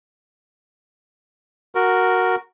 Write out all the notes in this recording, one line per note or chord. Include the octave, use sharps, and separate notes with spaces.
F#4 A#4